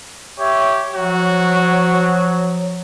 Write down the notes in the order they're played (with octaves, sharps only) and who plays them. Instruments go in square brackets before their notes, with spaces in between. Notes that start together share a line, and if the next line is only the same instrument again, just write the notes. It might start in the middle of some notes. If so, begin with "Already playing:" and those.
[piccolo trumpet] G4 [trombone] C#5 [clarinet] E5
[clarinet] F3 [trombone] F#3 [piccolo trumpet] F#4 [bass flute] C#5